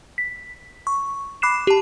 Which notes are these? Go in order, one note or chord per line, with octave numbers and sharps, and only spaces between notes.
B6
C#6
B5 D6 F#6 C7 E7
G4 A5